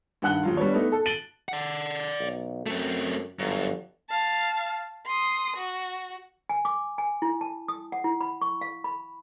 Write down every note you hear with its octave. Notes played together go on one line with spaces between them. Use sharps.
G2 D#3 F#5 F#6 G7
D#1 F#3 F4
G3 B3 D4 C#5
A3 B3 D#4
A4
A6 D7 D#7 F#7 G7
D5 F#5
B1
F#2 A3 C4
G1 F#2
F5 A5
C6 D#6
F#4
G#5
D6
G#5
E4
A5
D#6
F#5
E4
B5
C#6
F5
B5